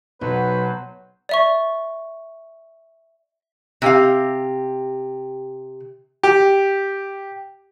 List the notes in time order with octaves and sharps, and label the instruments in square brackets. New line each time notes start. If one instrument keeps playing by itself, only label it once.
[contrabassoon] B1 [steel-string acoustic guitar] B2 [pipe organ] F#3 C5 [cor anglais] B4
[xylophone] D5 E5 C#6
[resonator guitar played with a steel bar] C3 G4 F5
[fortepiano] G4